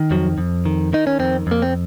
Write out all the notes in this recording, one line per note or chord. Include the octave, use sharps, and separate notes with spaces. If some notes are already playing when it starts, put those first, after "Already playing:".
Already playing: D#3
F2 F#3
F2
D#3
D#3 D#4
C#4
F2 C4
F2 A#3
C4